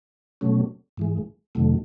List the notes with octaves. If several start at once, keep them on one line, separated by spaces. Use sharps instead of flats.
B2 F#3 A3 C#4
G#2 E3 G#3
F2 C3 D#3 F#3 A3